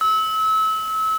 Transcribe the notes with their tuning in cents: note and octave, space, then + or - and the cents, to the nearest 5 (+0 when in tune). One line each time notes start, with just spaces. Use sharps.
E6 -30